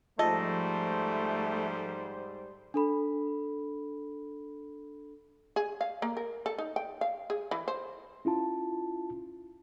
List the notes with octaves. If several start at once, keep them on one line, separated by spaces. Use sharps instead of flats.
G#2 F3 G3 A3 A4 C5 D#5
D4 A4 B5
G#4
F5
A#3
A#4
A4
D#4
G5
F5
G#4
E3
C5
C#4 E4 F4 A5